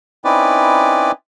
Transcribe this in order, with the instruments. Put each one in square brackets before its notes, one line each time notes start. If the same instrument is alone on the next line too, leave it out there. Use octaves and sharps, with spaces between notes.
[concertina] C4 C#4 D#4 E4 B4 D5